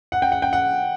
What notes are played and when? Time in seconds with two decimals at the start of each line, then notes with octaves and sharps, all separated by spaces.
0.12 F#5
0.22 G5
0.32 F#5
0.42 G5
0.53 F#5